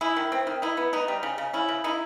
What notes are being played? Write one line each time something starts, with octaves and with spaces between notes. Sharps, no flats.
G#3 E4
D#3
C4
D#3
D#4 E4
B3
B3 D#4
G3
C#3
C#3
C#4 E4
C#3
D#4 E4